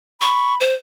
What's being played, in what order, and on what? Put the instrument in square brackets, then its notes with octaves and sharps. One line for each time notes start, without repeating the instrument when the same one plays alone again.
[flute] B5 [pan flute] C#6
[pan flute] C5